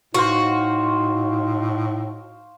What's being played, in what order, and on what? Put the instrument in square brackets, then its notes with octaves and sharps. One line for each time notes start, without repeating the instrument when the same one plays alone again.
[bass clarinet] A2 [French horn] D#4 [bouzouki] F#4 [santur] C5 F5 C#6